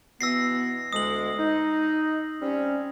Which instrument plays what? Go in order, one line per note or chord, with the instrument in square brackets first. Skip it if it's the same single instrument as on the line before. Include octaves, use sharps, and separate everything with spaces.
[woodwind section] B2 E3 B3 [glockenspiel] E6 A#6 C7
[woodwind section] D2 G#3 [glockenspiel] D#6 F#7
[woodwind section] D#4
G3 C4 C#4